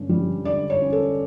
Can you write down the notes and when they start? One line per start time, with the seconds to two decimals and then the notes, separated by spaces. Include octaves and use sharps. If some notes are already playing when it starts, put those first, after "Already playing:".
Already playing: G2 D3 C#4
0.09 G3
0.45 D3 D5
0.70 C#5
0.82 C#4
0.92 A4